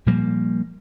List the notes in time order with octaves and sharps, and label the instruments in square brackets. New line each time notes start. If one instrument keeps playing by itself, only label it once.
[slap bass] A#2 F3 G3 A#3